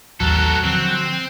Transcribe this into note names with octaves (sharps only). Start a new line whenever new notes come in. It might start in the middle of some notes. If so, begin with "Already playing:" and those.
A1 D#2 F#3 A4 A#4
D3 F3 C4